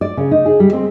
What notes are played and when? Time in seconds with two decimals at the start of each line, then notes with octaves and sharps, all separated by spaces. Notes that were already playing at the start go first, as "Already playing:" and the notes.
0.01 D5
0.17 C#3
0.31 D#4
0.46 G#4
0.60 G3
0.73 C4